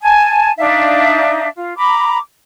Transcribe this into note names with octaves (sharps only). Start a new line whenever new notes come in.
G#5 A5
D4 D#4 E5 F5
F4
A#5 B5 D6